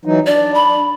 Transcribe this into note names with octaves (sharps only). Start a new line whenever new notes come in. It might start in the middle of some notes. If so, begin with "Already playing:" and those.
E3 F#3 D#4
D4 D5
B5